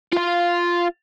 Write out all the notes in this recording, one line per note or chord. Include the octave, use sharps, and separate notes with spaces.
F4 F5